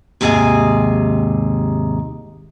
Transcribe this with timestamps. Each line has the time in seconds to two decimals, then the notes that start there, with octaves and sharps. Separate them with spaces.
0.21 D#2 G#2 C3 G#4 F5 G#5